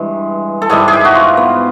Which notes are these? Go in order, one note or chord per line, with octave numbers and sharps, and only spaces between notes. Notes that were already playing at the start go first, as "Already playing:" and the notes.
Already playing: G2 E3 G#3
A4
G#2 E3 G3 G#4
G#4
G4
F#4
F4
B3